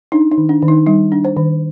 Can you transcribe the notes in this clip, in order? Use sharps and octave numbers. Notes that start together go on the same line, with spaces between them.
D4 D#4
D#4
D#3
D4
D#3
D#4
G3 D#4
D4
C5
D#3